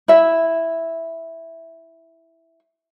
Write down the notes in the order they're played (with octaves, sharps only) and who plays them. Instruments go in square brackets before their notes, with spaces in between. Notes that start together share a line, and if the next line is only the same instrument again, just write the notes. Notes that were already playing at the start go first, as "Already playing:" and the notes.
[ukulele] E4 E5